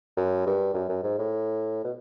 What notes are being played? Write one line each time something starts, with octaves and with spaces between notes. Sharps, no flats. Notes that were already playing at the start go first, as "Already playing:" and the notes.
F#2
G2
F#2
F#2
G#2
A2
B2